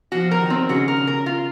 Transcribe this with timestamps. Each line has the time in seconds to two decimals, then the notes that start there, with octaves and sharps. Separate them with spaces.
0.12 F3 F#4
0.31 A#4
0.41 D#3
0.50 C4
0.69 C#3 F#4
0.88 A#4
0.97 C#3
1.07 A#4
1.26 F4